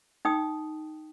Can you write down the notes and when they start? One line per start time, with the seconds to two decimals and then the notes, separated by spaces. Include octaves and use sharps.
0.25 D#4 G5 D#6